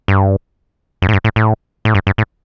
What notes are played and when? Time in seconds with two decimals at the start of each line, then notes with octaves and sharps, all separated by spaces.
0.08 G2
1.02 F#2
1.09 A2
1.13 G2
1.24 A2
1.36 A2
1.85 A2
1.95 G2
2.07 G2
2.18 A2